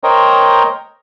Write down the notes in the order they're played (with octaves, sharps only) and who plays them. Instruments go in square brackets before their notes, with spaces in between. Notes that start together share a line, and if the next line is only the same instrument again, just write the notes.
[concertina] A#4 C5 C#5 D#5 G5 A#5